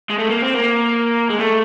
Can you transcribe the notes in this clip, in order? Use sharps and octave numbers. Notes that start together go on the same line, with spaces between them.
G#3
A3
A#3
C4
A#3
G#3
A3